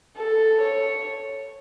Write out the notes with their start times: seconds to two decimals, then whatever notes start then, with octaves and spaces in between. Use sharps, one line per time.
0.17 A4
0.61 C#5